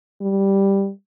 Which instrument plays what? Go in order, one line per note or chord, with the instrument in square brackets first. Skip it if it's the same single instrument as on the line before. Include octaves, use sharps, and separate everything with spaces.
[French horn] G3